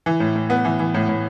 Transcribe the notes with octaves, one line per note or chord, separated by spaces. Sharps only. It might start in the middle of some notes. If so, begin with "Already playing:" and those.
E3
A2
A2
B3
E3
E3
A2
A2